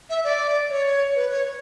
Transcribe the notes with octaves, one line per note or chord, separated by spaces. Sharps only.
E5
D5
C#5
B4
C#5